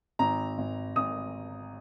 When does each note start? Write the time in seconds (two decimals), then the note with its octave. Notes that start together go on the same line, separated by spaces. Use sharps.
0.19 G#1 A#5
0.58 G#1
0.96 G#1 D#6